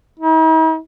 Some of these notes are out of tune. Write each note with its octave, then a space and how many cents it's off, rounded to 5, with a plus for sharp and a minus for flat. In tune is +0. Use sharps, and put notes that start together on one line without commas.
D#4 +45